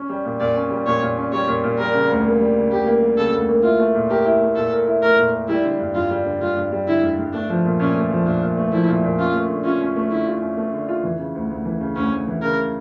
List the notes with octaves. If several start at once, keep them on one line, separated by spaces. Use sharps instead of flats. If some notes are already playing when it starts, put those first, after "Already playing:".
Already playing: C#4
G3
A#2
A#2 D5
C#4
G3
A#2 C#5
A#2
C#4
G3 C#5
A#2
A#2
G3 A#4
C#3
D2
A#3
G3
C#3
D2 G4
A#3
G3
C#3 A4
D2
A#3
E4 F4
A3
A#2
G4 A#4
E4
A3
A#2 A4
A#4
E4
A3 A#4
A#2
A#4
G3 E4
D3
G2
G2 F4
G3
D3
G2 F4
G2
G3
D3 E4
G2
G2
A3 D4
F3
A#2
A#2 C#4
A3
F3
A#2 D4
A#2
A3
F3 E4
A#2
A#2
C#4 F4
A3
D3
C#4 F4
C#4
A3
D3 E4
F4
C#4
A3
D3
F4
E3
C#3
D2
D2
E3
C#3
D2 C#4
D2
E3
C#3 A#4